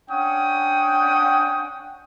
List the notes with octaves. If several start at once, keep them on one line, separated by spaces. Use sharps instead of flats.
C#4 D4 F#5 G5 D#6